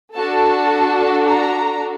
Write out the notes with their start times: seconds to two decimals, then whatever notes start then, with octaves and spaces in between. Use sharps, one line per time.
0.15 D4 F#4 A4 A5
1.27 A#5